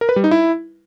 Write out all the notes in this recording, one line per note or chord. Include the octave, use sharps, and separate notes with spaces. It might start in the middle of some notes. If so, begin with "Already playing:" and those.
A#4
B4
G3
D#4
E4